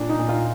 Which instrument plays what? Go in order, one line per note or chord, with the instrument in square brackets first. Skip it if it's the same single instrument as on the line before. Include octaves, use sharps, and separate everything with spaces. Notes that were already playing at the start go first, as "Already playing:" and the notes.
Already playing: [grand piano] A#2 D4
D#4
A#2
F4